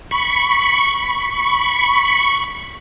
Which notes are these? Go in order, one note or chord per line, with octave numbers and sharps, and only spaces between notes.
B5 C#6